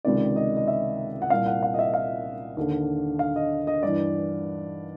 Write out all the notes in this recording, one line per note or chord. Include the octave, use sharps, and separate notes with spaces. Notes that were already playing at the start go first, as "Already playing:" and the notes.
C#2 C3 D#3 D5
D#5
D#5
E5
F#5
C2 A#2 F5
F#5
F5
D#5
E5
F5
D#2 D3
F5
D#5
D#5
G2 E3 D5